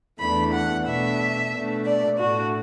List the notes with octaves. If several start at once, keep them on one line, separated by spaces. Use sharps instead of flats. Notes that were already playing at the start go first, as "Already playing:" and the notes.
E2 E3 A3 D4 B5
F#5
B2 A3 D4 E5
B2 A3 D4
D5
A2 A3 D4 F#4